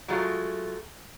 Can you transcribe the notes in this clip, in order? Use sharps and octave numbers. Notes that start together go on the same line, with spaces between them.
F#3 G#3 A3 F4